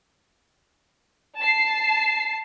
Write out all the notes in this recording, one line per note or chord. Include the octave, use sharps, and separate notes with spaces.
A5 C7